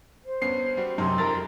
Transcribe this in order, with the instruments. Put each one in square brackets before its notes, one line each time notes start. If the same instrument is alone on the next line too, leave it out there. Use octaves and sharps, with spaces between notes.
[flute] C5
[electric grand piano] G2 B3 C#4 [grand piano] C7
[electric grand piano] G3 F#4
[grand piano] F#2 C3 [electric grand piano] D#4 G#5 [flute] C6
[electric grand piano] F2 [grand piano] A#4 A6